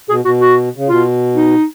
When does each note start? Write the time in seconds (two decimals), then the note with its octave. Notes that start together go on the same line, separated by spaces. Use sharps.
0.09 B2 G#4
0.25 B2 F#4
0.41 F#4
0.77 C#3
0.88 B2 F4
1.35 D#4